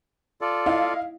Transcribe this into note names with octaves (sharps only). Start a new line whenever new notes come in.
F4 A4 D5
E4 D#5 F5